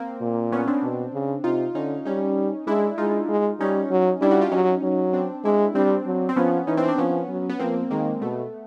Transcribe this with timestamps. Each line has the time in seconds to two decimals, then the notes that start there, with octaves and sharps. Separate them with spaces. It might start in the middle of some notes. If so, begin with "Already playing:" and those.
Already playing: A#3 C4
0.21 A#2
0.52 B3 C#4
0.67 C4 D4
0.83 B2
1.14 C#3
1.44 C3 D#4 F4
1.75 D3 C#4 D#4
2.05 G3 C#4 D#4
2.67 G#3 D4 E4
2.98 G#3 D#4 F4
3.29 G#3
3.60 G3 C#4 D#4
3.91 F#3
4.21 G3 D4 E4
4.31 E4 F#4
4.41 F4 G4
4.52 F#3 C#4 D#4
4.83 F#3
5.13 C4 D4
5.45 G#3 D4 E4
5.75 G3 C4 D4
6.06 F#3
6.29 C4
6.36 F3 B3 C#4
6.67 E3 C#4 D#4
6.77 C4 D4
6.88 C4 D4
6.98 F3 B3 C#4
7.29 F#3
7.49 B3
7.59 F3 A#3 C4
7.91 D#3 G#3 A#3
8.22 B2 A3 B3